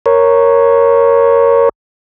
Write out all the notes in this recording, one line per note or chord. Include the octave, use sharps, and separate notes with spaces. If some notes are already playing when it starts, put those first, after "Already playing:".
A#4 C#5